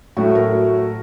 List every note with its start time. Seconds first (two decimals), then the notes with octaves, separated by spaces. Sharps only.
0.17 A2 F#3 A3 F#4
0.35 A#4